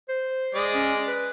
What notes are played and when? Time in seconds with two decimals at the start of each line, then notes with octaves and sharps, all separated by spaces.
0.09 C5
0.55 G#3 D5 D#5
0.74 C#4
1.07 B4